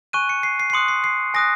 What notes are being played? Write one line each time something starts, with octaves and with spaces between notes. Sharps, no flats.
G#5 C#6 F#6 D#7
C#7
C7
C7
C7
C6 D#6 F#6 C#7
C7
C7
G#5 D#6 F#6 A#6